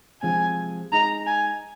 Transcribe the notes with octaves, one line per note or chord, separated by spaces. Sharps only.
C3 F3 G#3 C4 G#5
G#3 D#4 G#4 D#5 A#5
G#5